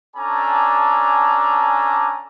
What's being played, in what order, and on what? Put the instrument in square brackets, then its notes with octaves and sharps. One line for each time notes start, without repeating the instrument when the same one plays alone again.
[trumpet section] C#4 D4 A4 D5 G#5 A#5